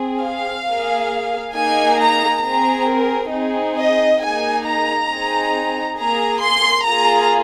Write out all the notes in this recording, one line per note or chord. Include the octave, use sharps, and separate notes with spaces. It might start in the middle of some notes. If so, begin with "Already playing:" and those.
Already playing: C4 G#4
F5
A#3 G#4
A#3 D#4 G#4 G#5
A#5
C4 G#4 A#5
A#4
C4 D#4 G#4
D#5
A#3 D#4 G#4 G#5
A#5
C4 D#4 G#4
A#3 G#4 A#5
C6
A#3 F4 G#4 A#5